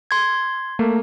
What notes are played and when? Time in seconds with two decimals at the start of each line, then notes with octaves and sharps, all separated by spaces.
0.11 C6 G#6
0.79 A3 A#3